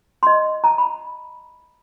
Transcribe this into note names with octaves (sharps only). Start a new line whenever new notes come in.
D#5 C6
A5 A#5
B5